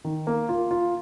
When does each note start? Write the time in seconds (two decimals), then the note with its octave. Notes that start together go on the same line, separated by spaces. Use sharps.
0.05 D#3
0.27 A#3
0.49 F4
0.71 F4